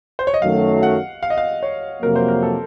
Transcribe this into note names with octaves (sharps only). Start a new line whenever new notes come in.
C5
C#5
D#5
F#2 D#3 F#3 A3 F5
F#5
F5
D#5
F5
C#5
F2 C3 F#3 A#3 A#4
C5
A#4
A4